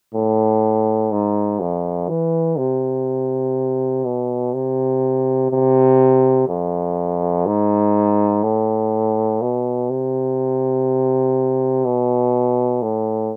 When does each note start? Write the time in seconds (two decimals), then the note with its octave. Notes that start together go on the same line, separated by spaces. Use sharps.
0.14 A2
1.12 G#2
1.60 F2
2.09 E3
2.58 C3
4.05 B2
4.53 C3
5.51 C3
6.48 F2
7.46 G#2
8.43 A2
9.41 B2
9.90 C3
11.85 B2
12.82 A2